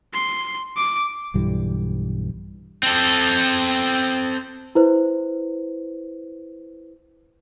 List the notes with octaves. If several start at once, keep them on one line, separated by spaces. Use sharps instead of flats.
C6
D6
B1 G2 E3 G3
C4 A4
E4 B4 C5